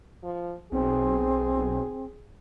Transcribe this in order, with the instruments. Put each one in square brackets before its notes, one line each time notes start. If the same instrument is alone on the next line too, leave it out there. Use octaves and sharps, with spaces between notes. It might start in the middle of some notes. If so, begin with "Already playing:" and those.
[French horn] F3
[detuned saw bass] B1 [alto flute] C4 [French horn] G#4